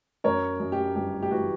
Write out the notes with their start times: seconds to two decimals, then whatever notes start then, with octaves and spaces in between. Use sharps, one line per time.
0.24 F#2 A#4 C#5
0.60 F#2
0.72 G4
0.95 G1 G4
1.22 G4
1.31 E3 F#4